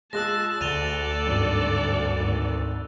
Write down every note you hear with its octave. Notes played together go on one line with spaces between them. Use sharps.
G#3 F4 G#4 A5 E6 F#6 A#6
D2 A4 D5 A6 D#7 F7 G7
G#1 G2
G#1